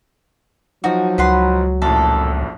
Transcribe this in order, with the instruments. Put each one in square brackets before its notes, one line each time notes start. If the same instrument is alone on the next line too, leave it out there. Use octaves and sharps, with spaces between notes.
[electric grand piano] F3 D#4 [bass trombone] F#3 [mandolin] F#4
[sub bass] C#2 [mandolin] B4 F#5 C6
[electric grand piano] A#1 F#2 A2 [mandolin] A4